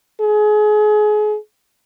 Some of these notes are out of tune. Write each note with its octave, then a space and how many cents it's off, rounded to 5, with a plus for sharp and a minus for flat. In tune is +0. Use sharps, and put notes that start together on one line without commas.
G#4 +30